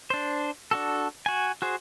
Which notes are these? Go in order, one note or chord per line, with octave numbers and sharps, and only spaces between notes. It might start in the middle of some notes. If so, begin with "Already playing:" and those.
D4 C5
D4 F#4 A4
F#4 G#5
F#4 G#4 C5